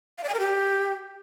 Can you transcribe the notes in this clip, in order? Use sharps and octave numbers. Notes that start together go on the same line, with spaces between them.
F5
D5
G#5
A#4
G4